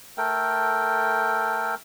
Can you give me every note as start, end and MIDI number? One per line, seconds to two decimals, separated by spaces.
0.17 1.75 57
0.17 1.75 69
0.17 1.75 70
0.17 1.75 79